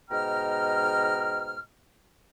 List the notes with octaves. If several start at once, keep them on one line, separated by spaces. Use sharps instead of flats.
G#2 B2 D#5 G5 A#5 F6